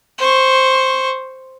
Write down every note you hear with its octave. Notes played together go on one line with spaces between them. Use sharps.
C5 C#6